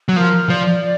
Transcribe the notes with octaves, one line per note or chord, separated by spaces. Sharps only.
F#3
F3 A#4
F3 D5